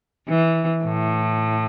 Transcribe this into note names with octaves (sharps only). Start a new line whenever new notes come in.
E3
A2